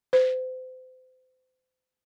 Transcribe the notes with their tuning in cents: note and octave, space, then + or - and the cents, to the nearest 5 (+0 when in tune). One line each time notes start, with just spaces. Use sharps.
C5 -35